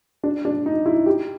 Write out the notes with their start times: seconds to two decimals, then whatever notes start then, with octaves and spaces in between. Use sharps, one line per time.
0.24 D4
0.45 D4
0.66 D#4
0.86 E4
1.06 G4